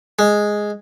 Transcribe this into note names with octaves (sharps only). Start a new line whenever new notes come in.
G#3